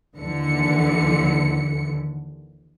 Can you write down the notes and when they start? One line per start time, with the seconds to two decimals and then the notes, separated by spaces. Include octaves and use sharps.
0.17 D#2 D3 E3 C#7